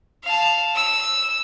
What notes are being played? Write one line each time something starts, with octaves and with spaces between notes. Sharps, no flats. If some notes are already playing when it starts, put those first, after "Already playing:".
F5 A5
E6